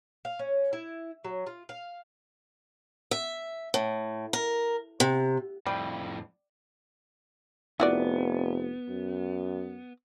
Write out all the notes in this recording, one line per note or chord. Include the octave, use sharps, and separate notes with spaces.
F5
C#4
E4
F#3
F4
F5
E5
A2
A#4
C3
F2 A2 G3
F1 B3 E4 F#4 D5
F#2